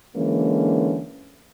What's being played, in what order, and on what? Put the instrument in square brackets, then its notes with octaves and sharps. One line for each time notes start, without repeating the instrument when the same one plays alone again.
[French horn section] D3 E3 G#3 A#3 C#4